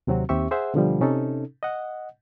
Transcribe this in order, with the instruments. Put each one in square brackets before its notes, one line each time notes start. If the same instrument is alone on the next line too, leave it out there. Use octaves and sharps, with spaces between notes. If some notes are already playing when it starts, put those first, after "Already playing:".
[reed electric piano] D#2 C3 F#3 C4 F#4
D#2 C4 G4 E5 C#6
G#4 C5 E5 F#5
B2 D3 F3 G3
C3 C#4 D#4 A4
D#5 F#5